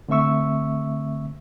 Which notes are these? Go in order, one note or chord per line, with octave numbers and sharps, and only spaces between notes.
D3 A3 C4 E5 C#6 E6